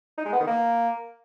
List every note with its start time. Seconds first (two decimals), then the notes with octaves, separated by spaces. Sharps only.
0.18 D#4
0.25 G#3
0.33 B3
0.40 D#3
0.48 A#3